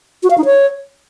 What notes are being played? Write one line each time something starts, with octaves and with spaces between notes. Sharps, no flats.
F#4
F5
D#4
C#5